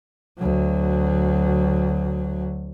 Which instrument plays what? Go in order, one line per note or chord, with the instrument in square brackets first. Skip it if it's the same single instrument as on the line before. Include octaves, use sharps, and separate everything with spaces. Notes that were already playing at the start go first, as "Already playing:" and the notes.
[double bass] D2 F#3